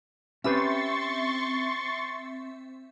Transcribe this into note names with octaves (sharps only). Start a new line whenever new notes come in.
C4 C#4 G4 B4 E5 C6 C#6 A6